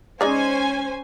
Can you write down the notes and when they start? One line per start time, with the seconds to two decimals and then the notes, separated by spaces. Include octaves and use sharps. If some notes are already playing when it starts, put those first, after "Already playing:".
0.21 G#3 C#4 D#4 C5 D5 G#5